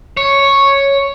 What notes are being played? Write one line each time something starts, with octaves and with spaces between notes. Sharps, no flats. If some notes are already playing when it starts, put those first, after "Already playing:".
C#5